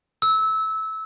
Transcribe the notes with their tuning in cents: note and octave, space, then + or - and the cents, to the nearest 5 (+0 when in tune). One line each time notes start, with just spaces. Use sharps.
E6 -20